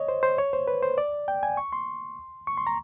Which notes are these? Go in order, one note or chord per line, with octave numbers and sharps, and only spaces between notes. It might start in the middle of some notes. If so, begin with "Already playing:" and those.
Already playing: C#5 D#5
C5
C5
C#5
C5
B4
C5
D5
G5
G#5
C#6
C6
C#6
C6
A#5